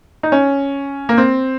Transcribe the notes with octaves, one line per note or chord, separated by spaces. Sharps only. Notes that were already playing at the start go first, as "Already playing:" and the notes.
D#4
C#4
A#3
C4